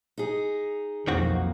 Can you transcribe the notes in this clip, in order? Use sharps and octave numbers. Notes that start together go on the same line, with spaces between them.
D#4 G#4
B1 F2 D#3 A#3 C4 F#4